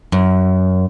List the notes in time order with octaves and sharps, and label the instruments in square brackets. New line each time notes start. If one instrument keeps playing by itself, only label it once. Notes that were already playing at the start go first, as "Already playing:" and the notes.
[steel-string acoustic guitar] F#2